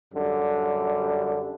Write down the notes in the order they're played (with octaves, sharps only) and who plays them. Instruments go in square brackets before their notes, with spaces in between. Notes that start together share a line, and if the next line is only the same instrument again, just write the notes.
[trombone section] F#2 D3 G3